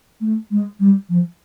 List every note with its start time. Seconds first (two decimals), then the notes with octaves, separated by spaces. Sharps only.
0.21 A3
0.51 G#3
0.80 G3
1.09 F3